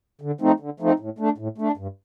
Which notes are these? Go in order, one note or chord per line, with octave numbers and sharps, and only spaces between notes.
D3
F3 A3 C4 D#4
D3
F3 A3 C4 D#4
A2
A3 D4
A2
A3 D4
G2